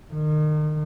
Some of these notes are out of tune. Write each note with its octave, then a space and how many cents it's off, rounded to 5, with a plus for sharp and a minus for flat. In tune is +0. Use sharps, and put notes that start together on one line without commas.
D#3 -35